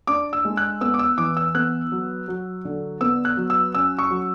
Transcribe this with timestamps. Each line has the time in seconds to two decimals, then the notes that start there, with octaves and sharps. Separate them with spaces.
0.07 D4 D6
0.33 E6
0.45 G#3
0.57 F#6
0.81 B3 E6
0.94 D6
0.99 E6
1.18 E3 D6
1.37 E6
1.55 B3 F#6
1.92 F#3
2.28 F#3
2.65 D3
3.01 B3 E6
3.25 F#6
3.37 F#3
3.50 E6
3.74 C#4 E6
3.98 C#6
4.10 F#3